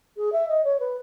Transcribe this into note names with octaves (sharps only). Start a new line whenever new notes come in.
G#4
E5
D#5
C#5
B4